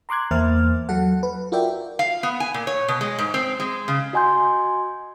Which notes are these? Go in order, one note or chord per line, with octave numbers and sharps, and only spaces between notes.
A#5 C6 D6 F#6 G#6
E2 A#3 C5 E5 F6 A6
F#3 A4 F#5
B4
F4 F#4 A#4 D5 E5 G5
F5
B3
G#5
A#2
C#5
B2
G#3
G#2
C4
G#3
C#3
F#4 D#5 G#5 C6 G6